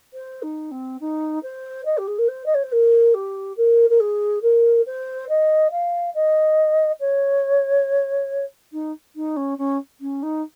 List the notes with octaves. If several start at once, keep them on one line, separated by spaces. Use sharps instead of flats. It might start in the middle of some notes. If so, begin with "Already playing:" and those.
C5
D#4
C4
D#4
C5
D#5
G4
G#4
A#4
C5
D#5
C#5
C5
A#4
G4
A#4
A#4
G#4
A#4
C5
D#5
F5
D#5
C#5
D#4
D#4
C#4
C#4
C#4
D#4